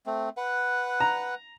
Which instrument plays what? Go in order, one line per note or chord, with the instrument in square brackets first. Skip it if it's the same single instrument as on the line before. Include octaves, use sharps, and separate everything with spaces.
[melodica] A3 C4
B4 F#5
[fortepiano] A#5